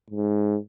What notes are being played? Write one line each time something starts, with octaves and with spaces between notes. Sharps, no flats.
G#2